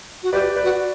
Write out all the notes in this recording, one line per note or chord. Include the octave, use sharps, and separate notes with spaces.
F#4
G4 B4 D5
B4 D5
F#4